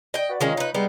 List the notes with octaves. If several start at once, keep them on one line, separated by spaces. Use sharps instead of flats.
D#5 G5
F#4 B4 D5
D#3 G#3 C#4 F4 C#5 D#5
D#4 B4
G3 G#3 B3 D#4